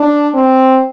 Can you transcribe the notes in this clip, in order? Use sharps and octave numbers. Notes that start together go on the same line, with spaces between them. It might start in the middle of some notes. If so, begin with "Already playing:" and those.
Already playing: D4
C4